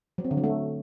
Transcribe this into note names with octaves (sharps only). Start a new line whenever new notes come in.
F#3
C4
D3
F#3
A3